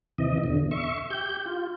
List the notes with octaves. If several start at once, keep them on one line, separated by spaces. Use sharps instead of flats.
D#2 C3 E3 D#5
E2 B2 D3
E5 C#6
G4 G6
F4